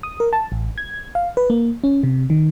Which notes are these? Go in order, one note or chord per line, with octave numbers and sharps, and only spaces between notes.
D#6
A#4
A5
A1
G#6
F5
B4
A#3
C#4
C3
D#3